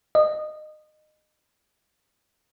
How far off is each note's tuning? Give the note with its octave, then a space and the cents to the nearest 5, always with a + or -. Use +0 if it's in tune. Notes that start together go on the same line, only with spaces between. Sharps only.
D#5 -25